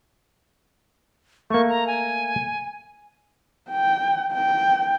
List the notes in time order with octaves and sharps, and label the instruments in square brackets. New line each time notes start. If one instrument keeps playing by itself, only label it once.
[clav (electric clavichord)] A3 A#3 [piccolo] C#6
[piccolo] A#5
G#5
[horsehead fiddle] G5
G5